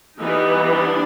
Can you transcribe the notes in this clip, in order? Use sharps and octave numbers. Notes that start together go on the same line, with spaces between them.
E3 G3 B3 D#4
D4